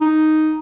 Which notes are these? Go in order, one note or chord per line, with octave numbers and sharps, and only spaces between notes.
D#4